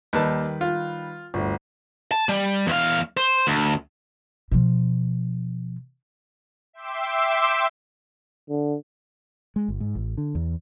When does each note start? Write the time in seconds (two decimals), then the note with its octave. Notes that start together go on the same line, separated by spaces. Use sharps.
0.13 D#2 D#3 G3 B4 A5
0.61 F4
1.34 G1 D2
2.12 A5
2.29 G3
2.68 E2 F5
3.17 C5
3.47 D2
4.51 B2 F3
6.73 E5 G5 C6 D6 E6
8.50 D3
9.56 G#3
9.69 G1
9.80 G#2
9.95 A1
10.18 D3
10.35 E2